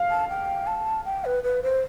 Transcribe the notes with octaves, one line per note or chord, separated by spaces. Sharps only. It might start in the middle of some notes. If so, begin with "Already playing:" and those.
Already playing: F5
A5
G5
A5
G5
B4
B4
C5